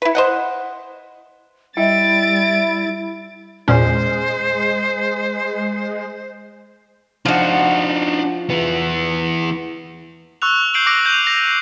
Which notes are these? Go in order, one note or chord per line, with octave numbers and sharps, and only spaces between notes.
E4 B4
C5 D#5 F#5
G3 E4 D#5 E5 G5 A6 D7
E2 A#2 G#3 C#4 C5
F3 D4 D#4 F#4
E3 B3
C#6 E6 F#6 F7
G6 C7 D7 F#7
D6 A#6 D7
G6 D#7 F7
A#6
C7